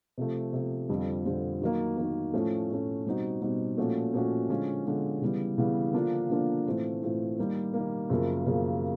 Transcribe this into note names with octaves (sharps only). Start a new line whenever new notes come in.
C3 F3 A3
C3 F3 A3
F2 D3 G3 C4 F4
F2 D3 G3 C4 F4
D#3 F#3 A#3
D#3 F#3 A#3
A2 F3 A3 C#4
A2 F3 A3 C#4
B2 G3 C4 D#4 F#4
B2 G3 C4 D#4 F#4
A#2 F3 A3 C#4 F#4
A#2 F3 A3 C#4 F#4
D3 F3 G#3 C#4 F4
D3 F3 G#3 C#4 F4
C#3 E3 G3 B3
C#3 E3 G3 B3
D3 F3 A#3 D4 F4
D3 F3 A#3 D4 F4
A2 E3 A3 C4 F4
A2 E3 A3 C4 F4
D#3 G3 A#3
D#3 G3 A#3
F#2 C#3 F3 A#3
F#2 C#3 F3 A#3